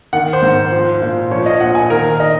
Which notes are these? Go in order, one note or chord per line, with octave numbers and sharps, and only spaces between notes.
D#3 F#5
C5
G#2
F3 C5
A#2
F3 C#5
D#5
A#2 F#5
G#5
D#3 A#4
D#5